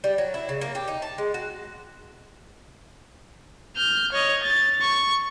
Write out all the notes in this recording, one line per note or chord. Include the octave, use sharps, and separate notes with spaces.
G3
F#3
E4
C#3
A#3
G4
D#4
A5
G#3
F#4
F6 G6
C#5 D#5
A6
C#6